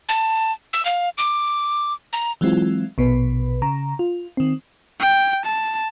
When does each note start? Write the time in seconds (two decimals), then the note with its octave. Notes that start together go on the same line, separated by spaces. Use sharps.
0.09 A5
0.73 E6
0.85 F5
1.18 D6
2.13 A#5
2.41 E3 F#3 G#3 C4 E4 F4
2.98 A#1 B2 B3 B4
3.62 C#3 A#5
3.99 F4
4.37 D#3 C4
5.01 G5
5.46 A5